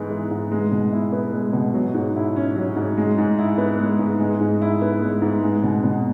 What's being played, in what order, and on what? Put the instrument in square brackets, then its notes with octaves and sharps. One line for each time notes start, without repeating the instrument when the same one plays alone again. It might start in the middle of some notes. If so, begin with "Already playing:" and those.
Already playing: [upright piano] G#2 E3 G#3 B3
E3
G#2
G#3
B2
E4
B3
G#3
B2
F#3
G#2
E4
C#4
F#3
G#2
G#3
G#2
E4
B3
G#3
G#2
G#3
G#2
E4
B3
G#3
G#2
G#3
B2
B2